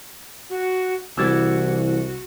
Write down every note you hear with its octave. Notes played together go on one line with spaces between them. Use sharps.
F#4
C2 E3 E4 F#4 E5 E6 G#6 A6